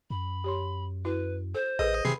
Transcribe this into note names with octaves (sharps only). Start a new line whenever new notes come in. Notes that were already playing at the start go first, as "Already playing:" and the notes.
F#2 B5
G4 C#5 C6
E4 F#4 B4
A4 C5
A1 G#4 A4 B4 D#5
C3 D#3 G#4 B5 C7